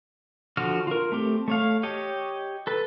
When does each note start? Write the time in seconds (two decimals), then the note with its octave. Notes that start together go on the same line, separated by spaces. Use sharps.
0.57 D3 F3 F#4 F6
0.87 F4 A#4
1.12 A3 C4 G4
1.48 A3 C#5 F5
1.83 G4 C#5 D#5
2.67 A4 B4